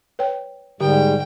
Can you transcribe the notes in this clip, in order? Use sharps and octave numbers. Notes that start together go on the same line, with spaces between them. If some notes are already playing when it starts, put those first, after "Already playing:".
B4 C#5 G5
G#2 D3 G3 G4 G5